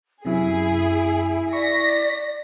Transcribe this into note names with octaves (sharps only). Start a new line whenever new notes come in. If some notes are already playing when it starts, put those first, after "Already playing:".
F#2 C3 E4 G#4
D5 C#6 A#6 B6